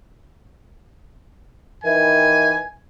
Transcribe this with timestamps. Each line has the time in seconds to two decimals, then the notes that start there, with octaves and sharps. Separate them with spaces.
1.84 D#3 E3 G#5